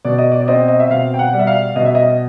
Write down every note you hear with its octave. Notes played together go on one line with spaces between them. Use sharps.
B2 D5
D#5
D5
D5
C4 D#5
D#5
E5
B2 F5
G5
F#5
G3
E5
F5
B2 D#5
E5
D#5